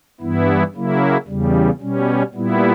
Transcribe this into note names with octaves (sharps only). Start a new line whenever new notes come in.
G2 E3 B3 E4
C#3 F#3 A#3 E4
E2 C#3 G3
B2 G3 C#4
A#2 G3 B3 E4